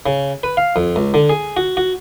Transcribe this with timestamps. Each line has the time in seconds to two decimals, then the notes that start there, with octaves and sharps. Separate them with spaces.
0.06 C#3
0.43 B4
0.57 F5
0.76 F2
0.96 C#2
1.14 D3
1.29 G#4
1.57 F#4
1.77 F#4